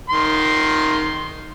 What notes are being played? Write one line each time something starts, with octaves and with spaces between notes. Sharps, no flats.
D#3 C6